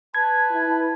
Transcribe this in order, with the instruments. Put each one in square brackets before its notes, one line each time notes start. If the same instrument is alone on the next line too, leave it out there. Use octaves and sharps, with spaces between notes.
[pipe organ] B4 [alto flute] A5 [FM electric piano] G#6
[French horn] E4